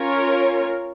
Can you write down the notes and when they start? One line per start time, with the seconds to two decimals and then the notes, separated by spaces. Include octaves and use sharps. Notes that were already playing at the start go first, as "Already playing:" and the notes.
Already playing: C#4 F4 A#4 C#5